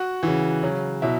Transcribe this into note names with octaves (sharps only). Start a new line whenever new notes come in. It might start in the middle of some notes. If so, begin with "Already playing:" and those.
Already playing: F#4 F#5
C#3 E3
C#3 F#3
B2 F#3 E4 E5